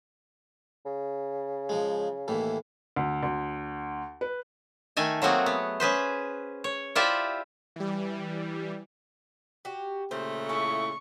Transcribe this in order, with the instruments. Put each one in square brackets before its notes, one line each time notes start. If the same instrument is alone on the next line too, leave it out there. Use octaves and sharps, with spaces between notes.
[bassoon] C#3
[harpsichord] F3 G#3
D#2 A2 E3
[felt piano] D2
D2
B4
[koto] D#3 A3 A4 G#5
F#3 A3 A#3 C4 F#4 G#4
B3
C#4 G#4 B4 C5
C#5
E4 F4 G4 C5 D5 E5
[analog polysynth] E3 G3
[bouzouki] F#4 G4
[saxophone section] A#2 C#3 A3 [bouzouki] C5
[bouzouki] E4 G#4 A4 [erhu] C#6